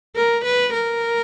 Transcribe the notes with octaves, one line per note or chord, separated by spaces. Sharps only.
A#4
B4
A#4